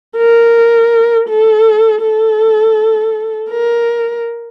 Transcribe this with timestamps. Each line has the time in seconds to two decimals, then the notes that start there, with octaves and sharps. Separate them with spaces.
0.17 A#4
1.28 A4
2.02 A4
3.50 A#4